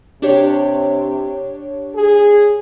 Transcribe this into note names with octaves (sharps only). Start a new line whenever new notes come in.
C3 D4 G4 C#5
G#4